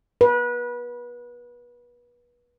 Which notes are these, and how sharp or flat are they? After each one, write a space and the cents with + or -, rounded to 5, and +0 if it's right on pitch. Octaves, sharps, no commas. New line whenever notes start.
B4 -30